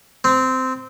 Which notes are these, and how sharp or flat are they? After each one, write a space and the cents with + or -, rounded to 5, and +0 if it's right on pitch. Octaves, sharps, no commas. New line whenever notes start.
C4 -15